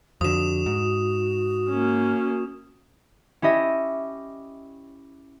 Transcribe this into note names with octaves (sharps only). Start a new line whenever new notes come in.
F2 D3 F#4 D#6 E7
G#2
A#3 C#4
C#4 E4 G4 D#5 E5